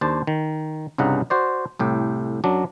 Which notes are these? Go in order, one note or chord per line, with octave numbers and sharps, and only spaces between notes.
D#2 D4 C5 A5
D#3
C2 G2 C#3 D#4 F#5 A#5
F#4 C5 D5
C2 A2 G4
F#2 F#3 D4